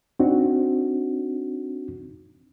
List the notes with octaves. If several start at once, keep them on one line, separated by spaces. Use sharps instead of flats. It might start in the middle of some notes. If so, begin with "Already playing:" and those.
C4 D4 D#4 F#4